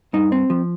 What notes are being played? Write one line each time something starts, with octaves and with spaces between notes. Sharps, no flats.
G2 D#4
C4
F3